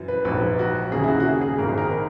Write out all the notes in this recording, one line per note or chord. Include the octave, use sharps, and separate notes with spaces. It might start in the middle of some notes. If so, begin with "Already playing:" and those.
Already playing: F#2 E3
B4
A#1 G#2 F#3 B4
F#4
D#2 C#3 F#3 A#3 C#4 G#4
E4
F#4
F#4
G#4
G#4
G#1 G#2 D#3 A#4
G#4
A#4
A#4